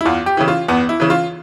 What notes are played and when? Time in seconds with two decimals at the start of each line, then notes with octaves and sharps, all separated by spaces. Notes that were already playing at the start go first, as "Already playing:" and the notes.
0.01 E4
0.05 E2 F4
0.26 G4
0.37 C#3 E3 E4
0.48 F4
0.68 E2 B3
0.89 E4
1.00 C#3 E3
1.10 F4